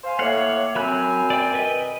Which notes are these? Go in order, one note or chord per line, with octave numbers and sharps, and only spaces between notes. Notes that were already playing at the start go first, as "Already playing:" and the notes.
C5 F5 G#5
A2 A#3 C#5 F5 F#5
F#2 F#3 C4 G#5 B5 F#6
D5 G5
A#4 B4 D#5